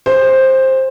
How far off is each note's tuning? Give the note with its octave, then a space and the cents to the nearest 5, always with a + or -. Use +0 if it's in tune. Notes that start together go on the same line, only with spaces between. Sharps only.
G#4 -45 C5 +10